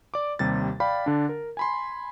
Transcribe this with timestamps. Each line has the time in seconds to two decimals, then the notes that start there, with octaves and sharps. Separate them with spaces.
0.14 D5 D6
0.39 D#2 C3 G3 A6
0.80 D5 F5 G5 B5
1.06 D3 D4
1.29 A#4
1.57 G#5 B5 C6